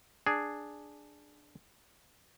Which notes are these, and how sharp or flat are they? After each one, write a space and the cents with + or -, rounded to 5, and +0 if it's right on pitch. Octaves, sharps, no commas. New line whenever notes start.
D4 +5 G#4 +0